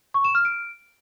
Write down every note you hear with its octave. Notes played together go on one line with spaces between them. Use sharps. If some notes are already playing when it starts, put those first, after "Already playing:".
C#6
E7
F6
D7